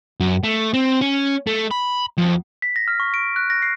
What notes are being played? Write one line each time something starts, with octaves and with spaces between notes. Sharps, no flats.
F#2
A3
C4
C#4
A3
B5
F2
B6
A#6
F6
C#6
D7
F#6
A#6
C7